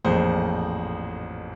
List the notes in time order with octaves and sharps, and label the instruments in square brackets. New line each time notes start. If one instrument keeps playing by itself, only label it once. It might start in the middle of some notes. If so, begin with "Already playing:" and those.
[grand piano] A1 F2 A#2 G#4 C5